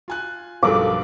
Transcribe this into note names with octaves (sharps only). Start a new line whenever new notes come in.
F4 G#5 F#6
B1 G2 F3 A4 A#4 F5 D6